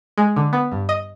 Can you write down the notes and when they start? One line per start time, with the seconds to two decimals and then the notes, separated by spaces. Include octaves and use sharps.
0.18 G#3
0.36 D3
0.53 B3
0.72 G2
0.89 D#5